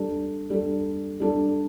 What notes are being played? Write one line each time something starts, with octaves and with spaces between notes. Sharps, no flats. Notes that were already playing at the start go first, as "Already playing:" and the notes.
Already playing: G3 D4 A4
G3 D4 A4
G3 D4 A4